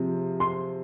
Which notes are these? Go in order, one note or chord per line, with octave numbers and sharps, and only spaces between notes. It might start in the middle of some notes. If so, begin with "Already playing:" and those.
Already playing: C3 F3 G#3
C6